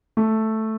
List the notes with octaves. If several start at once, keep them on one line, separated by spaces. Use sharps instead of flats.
A3